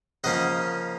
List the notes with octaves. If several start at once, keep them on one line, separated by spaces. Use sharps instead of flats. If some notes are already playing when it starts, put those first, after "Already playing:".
C#3 F3 A#3 C#4 D#5 F#5